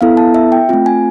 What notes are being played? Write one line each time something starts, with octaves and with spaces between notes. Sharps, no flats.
B3 E4 A4 F5
A5
E5
G5
A3 C4 F4
G#5